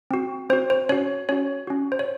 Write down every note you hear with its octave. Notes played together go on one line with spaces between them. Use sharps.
C4 F#4
C4 F#4 C5
C5
C#4 F#4 C#5
C#4 F#4 C#5
C#4 F#4
C5
C#5